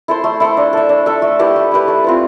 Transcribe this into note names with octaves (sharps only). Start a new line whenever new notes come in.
E4 A4 C5
A3
E4 A4 C5
D4
A4 E5
D4
A4 E5
A3
E4 G4 B4
A3
E4 G4 B4
A3
C4 F4 B4